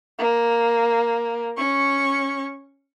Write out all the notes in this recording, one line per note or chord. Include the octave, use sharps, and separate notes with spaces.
A#3
C#4 C#6